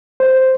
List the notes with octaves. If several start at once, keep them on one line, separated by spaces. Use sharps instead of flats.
C5